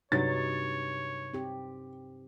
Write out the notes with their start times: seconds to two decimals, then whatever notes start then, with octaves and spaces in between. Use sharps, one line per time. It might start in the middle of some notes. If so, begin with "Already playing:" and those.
0.12 G2 C3 F#3 D#4 C#5 A6
1.34 C4 G4